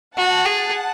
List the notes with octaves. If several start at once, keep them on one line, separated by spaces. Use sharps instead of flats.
F#4 F#5 A5
G#4